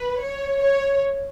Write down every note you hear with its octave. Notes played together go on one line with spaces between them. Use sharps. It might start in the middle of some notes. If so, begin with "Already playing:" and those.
Already playing: B4
C#5
C#5